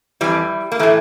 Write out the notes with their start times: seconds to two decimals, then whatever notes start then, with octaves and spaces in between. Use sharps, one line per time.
0.21 F2 E3 G3
0.72 A#3
0.79 A2 E3 A3